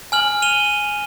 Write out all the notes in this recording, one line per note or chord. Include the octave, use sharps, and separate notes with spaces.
G#5 F6 F#7
D#7 F7 G7